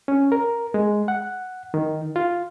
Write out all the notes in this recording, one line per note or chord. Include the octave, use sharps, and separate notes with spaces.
C#4
A#4
G#3
F#5
D#3
F4